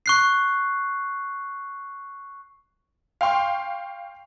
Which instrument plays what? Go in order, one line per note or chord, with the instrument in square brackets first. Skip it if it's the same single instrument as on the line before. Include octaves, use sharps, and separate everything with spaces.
[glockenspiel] C#6 F#6 C7
[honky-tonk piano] F5 G5 C6 C#6